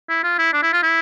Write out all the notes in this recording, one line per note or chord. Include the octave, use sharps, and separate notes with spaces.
E4
F4
E4
D4
E4
F4
E4